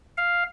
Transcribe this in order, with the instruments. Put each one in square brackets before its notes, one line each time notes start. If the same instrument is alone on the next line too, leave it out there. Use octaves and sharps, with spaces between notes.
[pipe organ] F5